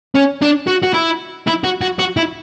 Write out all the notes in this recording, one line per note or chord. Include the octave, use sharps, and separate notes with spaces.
C#4
D4
F#4
F#4
E4
E4
F#4
F#4
F#4
E4